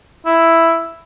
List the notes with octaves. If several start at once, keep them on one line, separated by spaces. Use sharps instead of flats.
E4